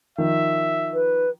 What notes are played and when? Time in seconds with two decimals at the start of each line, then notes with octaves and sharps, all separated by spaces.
0.18 D#3 F3 E5
0.94 B4